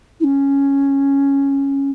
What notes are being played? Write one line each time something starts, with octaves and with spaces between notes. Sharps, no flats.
E4
C#4